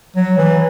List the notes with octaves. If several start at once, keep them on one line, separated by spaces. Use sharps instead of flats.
F#3
E3